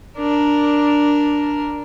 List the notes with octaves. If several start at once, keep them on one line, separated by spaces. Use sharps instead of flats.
D4 A#4